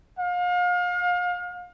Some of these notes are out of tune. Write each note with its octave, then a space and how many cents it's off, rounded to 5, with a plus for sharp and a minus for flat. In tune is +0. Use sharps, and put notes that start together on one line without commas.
F5 +35